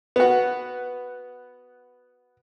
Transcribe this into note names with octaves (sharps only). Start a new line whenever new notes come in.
B3 F#4